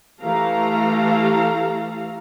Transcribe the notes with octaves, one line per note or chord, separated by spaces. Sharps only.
E3 A3 G4 A4 F5 A#5